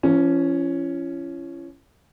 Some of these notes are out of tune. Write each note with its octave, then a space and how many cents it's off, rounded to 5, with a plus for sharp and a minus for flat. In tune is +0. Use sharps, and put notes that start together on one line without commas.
F3 -45 C#4 +0